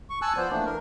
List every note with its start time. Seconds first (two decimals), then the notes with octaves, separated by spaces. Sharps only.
0.10 C#6
0.22 G#5 A5 E6 F#6
0.37 F3 B3 C5 D5
0.51 E3 A3 A#3 D4
0.65 A#4